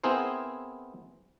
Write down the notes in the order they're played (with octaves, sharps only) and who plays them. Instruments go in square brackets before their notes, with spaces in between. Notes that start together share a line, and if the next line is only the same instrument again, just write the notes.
[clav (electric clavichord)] B3 C4 E4 G#4 A#4 C5